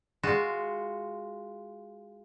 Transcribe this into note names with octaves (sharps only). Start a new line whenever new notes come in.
G#3 F4 F#4